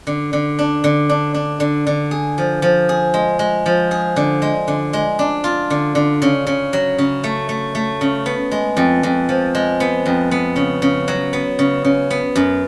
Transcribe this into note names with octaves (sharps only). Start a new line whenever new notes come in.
D3
D3
D4
D3
D4
D4
D3
D3
G#4
F3
F3
G#4
G#3
G#3
F3
G#4
D3
G#3
D3
G#3
D4
F4
D3
D3
C#3
C#3
F#3
C#3
A3
A3
A3
C#3
B3
G#3
F2
F2
F3
G#3
B3
F2
B3
C#3
C#3
F#3
B3
C#3
C#3
B3
F#2